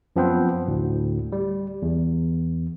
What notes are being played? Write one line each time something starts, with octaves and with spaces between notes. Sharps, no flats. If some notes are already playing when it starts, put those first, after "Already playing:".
F#2 F3 B3 C4 B4 C5
D2 A2
G3
E2